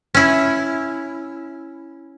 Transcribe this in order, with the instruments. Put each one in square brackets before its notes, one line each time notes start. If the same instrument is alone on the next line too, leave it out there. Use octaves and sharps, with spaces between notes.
[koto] C#4 E4